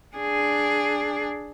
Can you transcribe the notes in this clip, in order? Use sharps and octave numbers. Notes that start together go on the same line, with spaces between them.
D4 G#4